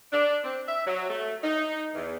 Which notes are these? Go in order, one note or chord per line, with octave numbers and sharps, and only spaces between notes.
D4
C4
E5
F#3
A3
D#4
E2